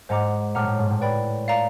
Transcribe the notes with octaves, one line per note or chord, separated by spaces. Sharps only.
G#2 C5 D#5 F#5 A#5 D6
A2 F#5 A#5 D6 F6
A2
G#2
A2
B4 D5 G5 B5
D5 F5 A#5